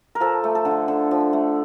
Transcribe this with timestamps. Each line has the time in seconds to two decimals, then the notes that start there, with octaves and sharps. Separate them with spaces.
0.15 A#4
0.20 F3 A4
0.44 A3
0.55 A4
0.65 D3
0.88 D3
1.11 F3
1.33 A3